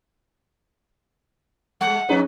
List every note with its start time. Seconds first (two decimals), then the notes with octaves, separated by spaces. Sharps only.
1.81 G3 G#3 F#5
2.09 F2 C#4 D#4 G#4 B4